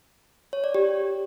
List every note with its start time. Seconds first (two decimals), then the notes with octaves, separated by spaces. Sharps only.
0.53 C#5
0.64 D5
0.74 G4